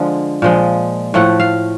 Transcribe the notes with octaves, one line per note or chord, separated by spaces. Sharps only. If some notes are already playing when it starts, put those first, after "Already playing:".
Already playing: D3 F3 G#3
A#2 F3 G#3
A2 F3 A3 F#5
F5